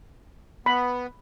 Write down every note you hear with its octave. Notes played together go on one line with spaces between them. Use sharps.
B3 B5